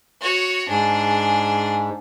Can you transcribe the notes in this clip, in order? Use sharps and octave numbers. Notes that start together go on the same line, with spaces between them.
F#4 C#5
G#2 D4 G#4